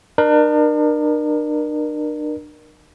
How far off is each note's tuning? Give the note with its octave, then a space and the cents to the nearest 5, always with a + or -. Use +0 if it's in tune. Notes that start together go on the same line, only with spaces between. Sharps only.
D4 +40 A#4 +25